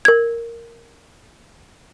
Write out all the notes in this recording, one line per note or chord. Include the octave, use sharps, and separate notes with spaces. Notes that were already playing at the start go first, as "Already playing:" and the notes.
A#4 G#6